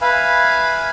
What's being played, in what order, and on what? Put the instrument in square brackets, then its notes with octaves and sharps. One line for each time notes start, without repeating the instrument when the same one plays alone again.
[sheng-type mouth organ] B4 E5 F5 G#5 B5